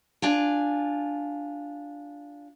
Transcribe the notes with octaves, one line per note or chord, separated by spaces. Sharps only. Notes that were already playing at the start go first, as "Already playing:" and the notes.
D4 F4 G#5